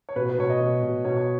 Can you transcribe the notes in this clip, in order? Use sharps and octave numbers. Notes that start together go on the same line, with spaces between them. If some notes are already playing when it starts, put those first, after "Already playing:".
C#5
B2 B4
B4
B2 C#5
D#5
B2
B2
B2 C#5
C#5